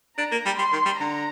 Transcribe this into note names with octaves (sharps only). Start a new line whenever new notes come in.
D4 A#5
A#3
G3
G3 C6
D#3
G3
D3 A#5